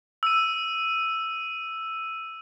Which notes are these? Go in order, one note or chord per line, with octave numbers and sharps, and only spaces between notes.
E6 D#7